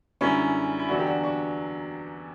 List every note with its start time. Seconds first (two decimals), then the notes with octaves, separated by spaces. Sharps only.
0.21 F#2 D3 G3 C#4 E4
0.79 E4
0.89 E2 D3 F#3 D4 F#4
0.99 G4
1.06 D4 F#4
1.23 D4 F#4